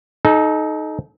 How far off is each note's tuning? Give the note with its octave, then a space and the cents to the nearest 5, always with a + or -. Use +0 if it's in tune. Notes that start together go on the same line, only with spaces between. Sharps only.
D#4 +0 A4 -35